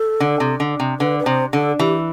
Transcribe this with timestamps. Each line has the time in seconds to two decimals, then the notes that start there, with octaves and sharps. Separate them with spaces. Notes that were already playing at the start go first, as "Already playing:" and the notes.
Already playing: A4
0.20 D3
0.40 C3
0.60 D3
0.80 C3
1.00 D3 B4
1.19 B4
1.26 C3 C5
1.53 D3 A4
1.79 E3 G4